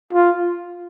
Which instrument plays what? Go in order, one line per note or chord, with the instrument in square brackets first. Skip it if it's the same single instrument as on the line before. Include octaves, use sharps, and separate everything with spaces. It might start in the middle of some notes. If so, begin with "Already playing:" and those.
[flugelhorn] F4